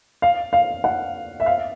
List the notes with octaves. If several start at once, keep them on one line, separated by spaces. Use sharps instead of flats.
F5
F5
F#5
E5
F5